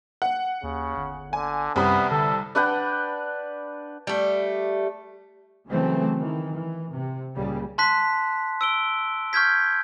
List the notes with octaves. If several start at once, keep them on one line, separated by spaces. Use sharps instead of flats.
F#5
D#2 C#3
G1
D3 G#5
C2 F#2 C3 B3 B5
D3 A4
D4 B4 F#5 G5
G3 A3
C#3 E3 F#3 A3 C4
D#3 E3
E3
C3
C#2 A#2 C#3 G3
A5 C6 F#6 B6
E6 D7 G7
C#6 F6 G6 G#6 B6